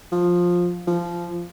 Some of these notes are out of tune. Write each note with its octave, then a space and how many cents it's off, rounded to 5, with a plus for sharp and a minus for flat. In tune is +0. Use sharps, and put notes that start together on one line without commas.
F3 +15
F3 -15